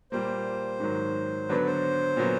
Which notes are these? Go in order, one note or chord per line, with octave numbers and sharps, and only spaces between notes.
A#2 G3 A#3 C5
G#2 D#3 F#3
D3 F#3 B3 D4 B4
C5
A#2 F#3 B3